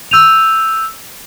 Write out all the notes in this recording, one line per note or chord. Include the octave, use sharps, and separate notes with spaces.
E6 G6 D#7 F7